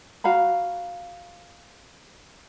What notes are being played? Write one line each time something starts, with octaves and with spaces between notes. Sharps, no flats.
F#4 F5 A#5 B5